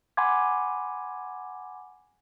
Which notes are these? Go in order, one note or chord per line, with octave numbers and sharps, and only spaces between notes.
F#5 G#5 B5 C6 D6 G#6